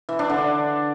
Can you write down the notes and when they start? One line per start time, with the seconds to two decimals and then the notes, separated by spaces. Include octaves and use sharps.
0.09 E3
0.19 D4
0.30 D3